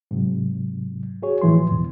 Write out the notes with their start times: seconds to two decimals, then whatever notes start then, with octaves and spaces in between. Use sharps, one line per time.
0.11 G#2 C3 F#3
1.22 F#4 G#4 C#5
1.42 A2 E3 F3 C6
1.71 E2 G#2 B2